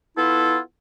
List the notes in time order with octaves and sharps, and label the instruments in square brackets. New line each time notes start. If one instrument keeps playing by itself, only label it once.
[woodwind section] B3 E4 F4 A4